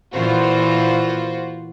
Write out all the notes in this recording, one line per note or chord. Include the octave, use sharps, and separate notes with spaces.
A#2 E3 A#3 F4 F#4 C5